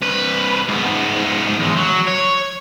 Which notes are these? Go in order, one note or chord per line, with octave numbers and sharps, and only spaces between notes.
C2 B4
G#2 B3
E2 G#3
F#3
C#5